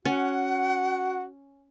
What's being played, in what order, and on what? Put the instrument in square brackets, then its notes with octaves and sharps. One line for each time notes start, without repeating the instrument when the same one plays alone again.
[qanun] C#4 [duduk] F#4 [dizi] F#5